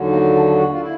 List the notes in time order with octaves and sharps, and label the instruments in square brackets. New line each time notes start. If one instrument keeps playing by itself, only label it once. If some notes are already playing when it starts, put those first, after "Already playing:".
Already playing: [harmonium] D#2 D3 F#3
A#3
D4
F#4
F4
E4